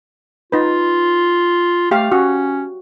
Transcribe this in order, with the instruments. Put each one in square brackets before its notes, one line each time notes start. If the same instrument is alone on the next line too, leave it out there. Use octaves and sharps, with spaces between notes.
[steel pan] D#4 B4 [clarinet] F4
[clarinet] A3 [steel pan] G4 F5
[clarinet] C#4 [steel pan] F#4